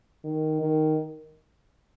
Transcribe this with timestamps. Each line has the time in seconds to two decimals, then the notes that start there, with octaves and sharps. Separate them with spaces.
0.24 D#3
0.61 D#3